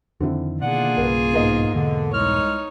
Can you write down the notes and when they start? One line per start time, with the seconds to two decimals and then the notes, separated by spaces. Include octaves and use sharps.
0.20 F2 D3 D#3 C4 E4
0.62 B2 D#3 A#3 D4 F4 G#4 D5 F#5
0.97 B1 G2 C#3 A#4 B4
1.33 G#2 B3 A#4 D#5
1.73 E2 G#2 B2 D3
2.12 C2 G#3 D#4 C#5 F6